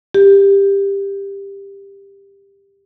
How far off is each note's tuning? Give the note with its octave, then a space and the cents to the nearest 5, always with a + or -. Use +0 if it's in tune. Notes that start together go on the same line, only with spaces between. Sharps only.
G4 +15